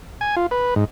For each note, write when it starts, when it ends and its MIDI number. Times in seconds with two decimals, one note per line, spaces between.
0.21 0.35 80
0.37 0.46 65
0.51 0.74 71
0.76 0.85 44